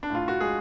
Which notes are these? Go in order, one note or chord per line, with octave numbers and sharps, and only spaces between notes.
D4
A2 F4
F#4
G#3 G#4